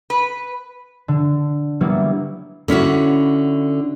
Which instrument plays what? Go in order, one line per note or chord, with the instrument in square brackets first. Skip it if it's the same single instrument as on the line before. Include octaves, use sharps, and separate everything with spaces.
[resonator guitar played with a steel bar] B4
[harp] D3
F#3 G3 A#3 B3 E4
[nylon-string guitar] D3 C#4 E4 F#4